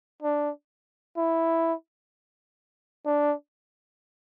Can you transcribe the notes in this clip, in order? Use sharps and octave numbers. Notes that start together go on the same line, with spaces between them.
D4
E4
D4